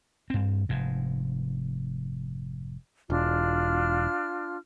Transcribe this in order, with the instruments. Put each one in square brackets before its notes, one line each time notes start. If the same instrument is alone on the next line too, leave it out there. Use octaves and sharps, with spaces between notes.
[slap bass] G2 C4
F1 G#2
[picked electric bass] E1 [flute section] D4 F4 F6